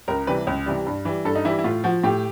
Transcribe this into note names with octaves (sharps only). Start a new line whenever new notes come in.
C#2 A#4
C3 E3 G3 B4
C#2
C3 E3 G3
G2
E3 G3
G2 A4
D#4
E3 G3 E4
E4
A2 F4
F3 F#4
A2 G4